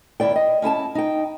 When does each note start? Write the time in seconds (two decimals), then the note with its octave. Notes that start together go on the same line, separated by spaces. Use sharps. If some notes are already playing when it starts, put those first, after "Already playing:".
0.20 D#2 E4 D5 G5
0.36 D#5
0.62 C#4 E4 G#5 A5
0.95 D#4 G5